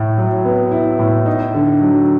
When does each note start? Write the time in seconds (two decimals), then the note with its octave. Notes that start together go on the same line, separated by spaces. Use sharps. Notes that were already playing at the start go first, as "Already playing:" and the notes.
Already playing: A2 E4
0.17 F#3
0.45 B3
0.71 E4
0.99 A2
1.26 D#4
1.54 D3
1.81 F#3